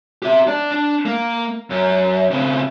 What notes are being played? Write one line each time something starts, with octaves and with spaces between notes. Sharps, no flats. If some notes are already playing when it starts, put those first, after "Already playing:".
G4 E5
D4 D5
D4
A#3
F#2
C#3 C4